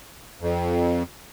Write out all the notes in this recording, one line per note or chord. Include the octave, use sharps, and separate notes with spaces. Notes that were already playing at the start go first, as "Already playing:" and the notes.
F2